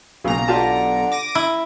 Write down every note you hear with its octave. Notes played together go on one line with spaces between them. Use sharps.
B1 A#2 C#3 A#5
D3 F4 G4 A5
D6 A#6 D#7
E4